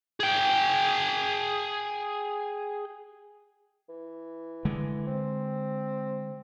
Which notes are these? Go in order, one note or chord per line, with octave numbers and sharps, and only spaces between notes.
G#4 G5
E3
D3 G#3
C4